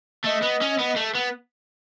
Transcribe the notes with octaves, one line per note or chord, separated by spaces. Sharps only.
A3 D#5
B3
C#4
B3
A3
B3